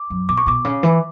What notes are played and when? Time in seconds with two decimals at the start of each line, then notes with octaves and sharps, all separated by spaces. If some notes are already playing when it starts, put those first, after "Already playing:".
Already playing: D6
0.10 F#2
0.28 B2 D6
0.38 C#6
0.46 B2 D6
0.65 C#3
0.83 E3